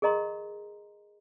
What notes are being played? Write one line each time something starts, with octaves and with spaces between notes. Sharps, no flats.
G#4 A#4 D#5 A#5 C6